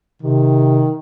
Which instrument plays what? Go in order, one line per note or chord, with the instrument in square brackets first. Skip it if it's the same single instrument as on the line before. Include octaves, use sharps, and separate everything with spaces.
[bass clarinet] C3 [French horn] D#3